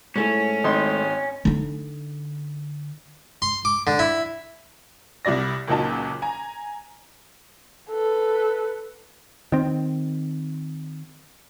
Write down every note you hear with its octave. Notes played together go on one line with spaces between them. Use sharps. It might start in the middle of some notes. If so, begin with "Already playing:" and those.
G#2 A3 C#4 E4
G#1 D#4 C6
D3 D#4
C6
D6
D3
E4
C2 G3 E4 D5 A#6
F#1 C#2 A#2 F#3 D#4 A5
G#5 A#5
A4 B4
D#3 C4